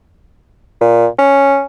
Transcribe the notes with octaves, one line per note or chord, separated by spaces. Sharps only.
A#2
C#4